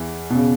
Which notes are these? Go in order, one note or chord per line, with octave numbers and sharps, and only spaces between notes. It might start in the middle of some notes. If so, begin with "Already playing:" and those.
Already playing: E2 E3
B2
C#3